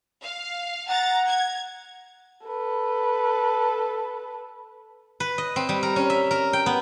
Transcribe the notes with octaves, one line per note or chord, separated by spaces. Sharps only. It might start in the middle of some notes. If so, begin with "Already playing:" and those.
F5
F#5 A#5 A6
G#6
A4 B4
B4
D#5
C4
G3
A#4
C#4
E5
A#4
G5
B3